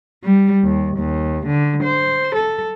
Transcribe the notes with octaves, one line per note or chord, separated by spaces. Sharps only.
G3
D#2
D#2
D3
C5
A4